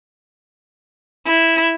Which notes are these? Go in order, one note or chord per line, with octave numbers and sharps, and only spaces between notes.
E4